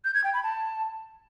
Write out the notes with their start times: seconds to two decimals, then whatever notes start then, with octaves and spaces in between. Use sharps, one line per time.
0.05 G6
0.14 G#6
0.24 G5
0.34 B5
0.43 A5